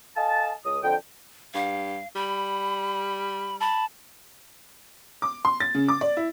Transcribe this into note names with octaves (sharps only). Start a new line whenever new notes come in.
A4 D#5 F5 G#5 A5
C#2 D#6
F2 D3 G5
G2 F5
G3 B5
A5 B5
D6
C6
A6
C#3
D6
D5
E4